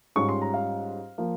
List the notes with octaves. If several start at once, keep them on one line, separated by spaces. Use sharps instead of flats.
G#2 G3 C#4 F4 C#6
C6
A#5
F5
F3 A#3